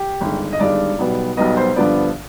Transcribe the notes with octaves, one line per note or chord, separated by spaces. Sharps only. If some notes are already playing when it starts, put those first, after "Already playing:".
Already playing: G4
G1 G2 D#3 G#3
D#5
G1 G2 D#3 G#3 D5
B1 B2 G3 B3
B1 B2 G3 B3 D#5
C5
G2 D3 F3 B3 D5